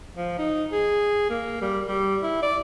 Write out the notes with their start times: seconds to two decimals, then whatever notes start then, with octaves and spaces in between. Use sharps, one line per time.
0.14 F3
0.38 D#4
0.72 G#4
1.30 A#3
1.62 G3
1.88 G3
2.23 E4
2.42 D5